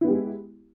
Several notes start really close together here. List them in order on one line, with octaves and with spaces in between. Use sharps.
E4 B3 G4 G#3